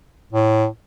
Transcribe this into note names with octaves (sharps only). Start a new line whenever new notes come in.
A2